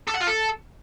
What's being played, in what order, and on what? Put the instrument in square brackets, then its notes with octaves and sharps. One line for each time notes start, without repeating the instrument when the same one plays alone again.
[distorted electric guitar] A4
F#5
F4
A4